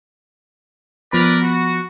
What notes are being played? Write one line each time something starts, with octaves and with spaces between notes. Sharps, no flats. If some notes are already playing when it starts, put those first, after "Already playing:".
F3 B3 A#4 B4 D5 B5
F#4